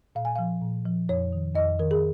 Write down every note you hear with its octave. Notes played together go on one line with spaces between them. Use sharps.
A#2 F5
G#5
F3 F5
A#2
F3
F2 C#5
D#3
F2 D#5
D#3 A#4
G#4